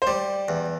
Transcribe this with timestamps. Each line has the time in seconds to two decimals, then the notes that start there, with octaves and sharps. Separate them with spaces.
0.02 C5
0.07 G3 D5
0.48 E2